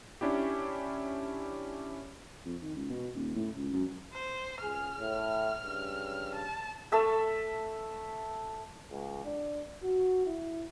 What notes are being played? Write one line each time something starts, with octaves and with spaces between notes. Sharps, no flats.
C#4 D4 E4 G4
F2
D#3
C#2
B2
D#1
A2
C#2
F#2
C5
C#2 G#4 F6
A2
G2 C#3
A5
A3 A4 E5 A5
C#2
D4
F#4
E4